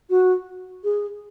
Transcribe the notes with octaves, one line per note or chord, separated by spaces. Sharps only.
F#4
G#4